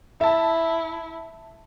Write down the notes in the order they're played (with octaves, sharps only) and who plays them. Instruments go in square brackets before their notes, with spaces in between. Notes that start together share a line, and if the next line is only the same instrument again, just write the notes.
[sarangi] E4 [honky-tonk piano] E5 A5